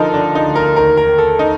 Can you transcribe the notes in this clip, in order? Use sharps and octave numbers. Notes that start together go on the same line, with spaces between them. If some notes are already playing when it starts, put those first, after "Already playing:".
Already playing: D3 F3 D#4 F4 A4 A#4
D3 D4
D#4
D2
A#4
D#2 A#4
A#4
D#3
A4
D#4